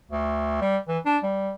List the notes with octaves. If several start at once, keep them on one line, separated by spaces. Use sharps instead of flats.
D2
G3
E3
D4
G3